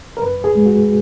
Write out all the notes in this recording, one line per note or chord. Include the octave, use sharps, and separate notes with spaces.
A#4
F#2 B4
G#4
G#3
F#4